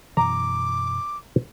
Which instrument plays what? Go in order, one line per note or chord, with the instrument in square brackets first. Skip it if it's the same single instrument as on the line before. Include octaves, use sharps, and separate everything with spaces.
[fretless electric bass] F#2 B2 E3 [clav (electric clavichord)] A#5 [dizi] D6